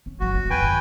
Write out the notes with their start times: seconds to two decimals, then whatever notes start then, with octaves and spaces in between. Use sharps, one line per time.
0.06 C#4
0.20 G1 F#3 F#4
0.35 A#3
0.50 F#1 C#2 B4 G5 G#5
0.62 F#2 D3